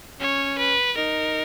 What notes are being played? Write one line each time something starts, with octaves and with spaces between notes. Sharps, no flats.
C#4 C#5
B4
D#4 A#4